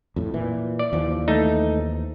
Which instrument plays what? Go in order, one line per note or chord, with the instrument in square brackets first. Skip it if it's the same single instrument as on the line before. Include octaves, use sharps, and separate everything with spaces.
[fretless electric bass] F2 A2
A#2 E3
[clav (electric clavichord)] D5
[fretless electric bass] D#2 E3 F3
[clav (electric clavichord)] A3 D#4